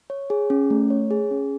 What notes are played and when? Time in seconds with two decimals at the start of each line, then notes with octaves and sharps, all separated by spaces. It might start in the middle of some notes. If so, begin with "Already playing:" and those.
0.10 C#5
0.30 G#4
0.50 C#4
0.70 A3
0.90 C#5
1.11 G#4
1.31 C#4